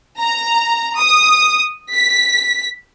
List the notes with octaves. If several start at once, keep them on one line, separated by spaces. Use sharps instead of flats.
A#5
D#6
B6